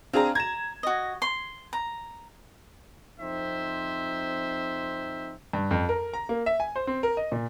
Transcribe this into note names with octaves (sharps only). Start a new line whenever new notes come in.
C4 D4 G#4 F5 A#5
A#5 G#6 E7
F#4 D#5
C6
A#5
F2 C4 D#4 C5 E5
G2
F2
A#4
A#5
A#3
E5
G#5
C5
C4
A#4
D#5
A#2